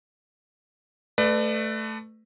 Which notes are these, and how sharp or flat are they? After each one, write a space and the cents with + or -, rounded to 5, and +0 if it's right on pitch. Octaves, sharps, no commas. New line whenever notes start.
A3 +0 B4 +20 D5 +30